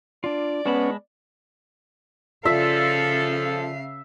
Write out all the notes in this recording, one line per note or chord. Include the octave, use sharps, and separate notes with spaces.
D4 F4 D5
G#3 B3 C#4 A5 B5
C#3 F3 F4 A4 D5 E5 F5